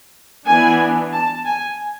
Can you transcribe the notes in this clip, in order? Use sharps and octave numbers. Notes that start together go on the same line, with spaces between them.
E3 B3 D4 G#5
A5
G#5